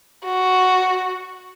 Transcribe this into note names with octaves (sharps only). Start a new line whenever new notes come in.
F#4